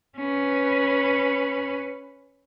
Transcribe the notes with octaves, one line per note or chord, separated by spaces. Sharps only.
C#4 B4